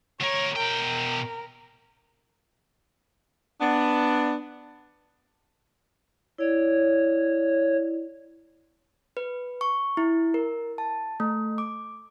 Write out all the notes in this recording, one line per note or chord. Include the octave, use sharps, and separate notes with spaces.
D2 A#4 C#5
B2 A#4 G5
B3 D4
E4 C#5 D5
B4
C#6
E4
A#4
A5
A3
D6